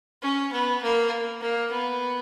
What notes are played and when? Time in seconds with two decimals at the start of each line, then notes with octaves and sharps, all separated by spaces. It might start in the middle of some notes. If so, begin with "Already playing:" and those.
0.23 C#4
0.52 B3
0.83 A#3
1.41 A#3
1.71 B3